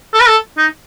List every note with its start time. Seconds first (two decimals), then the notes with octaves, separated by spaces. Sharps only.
0.14 A4
0.21 B4
0.27 A4
0.58 D#4